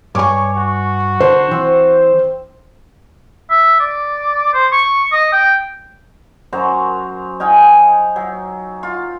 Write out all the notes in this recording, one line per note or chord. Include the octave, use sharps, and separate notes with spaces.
G2 C#5 G#5 C#6 D6
F#4
D3 C5 C6
E3 C4 E6
E5
D5
C5
C#6
D#5
G5
F#2 F#4 C5 A#5
D#4 F5 G5 G#5
F#3
F4